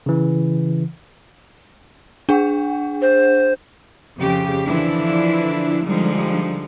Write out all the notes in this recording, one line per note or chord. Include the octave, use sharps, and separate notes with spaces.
C#3 E3
D4 G#4 F#5
C5
F2 C#3 G4
D3 E3 F3 D4 E4
D3 F3 G3 G#3 D#4